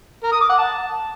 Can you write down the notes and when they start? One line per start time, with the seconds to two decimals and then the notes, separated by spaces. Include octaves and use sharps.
0.23 A#4
0.32 D#6
0.41 D6
0.49 F#5
0.58 A5